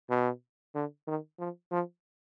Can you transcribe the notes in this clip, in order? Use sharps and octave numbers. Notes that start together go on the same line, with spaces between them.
B2
D3
D#3
F3
F3